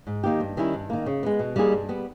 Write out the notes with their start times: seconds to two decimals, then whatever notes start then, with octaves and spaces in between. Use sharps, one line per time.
0.07 G#2
0.24 D#3 A#3 D#4 G4
0.40 G2
0.57 D#3 G3 C#4 E4
0.74 G2
0.90 D#3 A#3
1.06 C#3
1.23 G#3 B3
1.39 B2
1.56 G3 A#3 D#4 G#4
1.72 G2
1.89 G3 B3